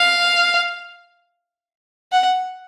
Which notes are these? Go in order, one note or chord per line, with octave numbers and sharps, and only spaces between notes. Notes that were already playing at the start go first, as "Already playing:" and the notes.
Already playing: F5
F#5